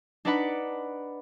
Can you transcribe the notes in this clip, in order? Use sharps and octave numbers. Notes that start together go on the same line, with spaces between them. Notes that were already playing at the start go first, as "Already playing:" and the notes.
D4 D#4 B4 D5 F#5 B5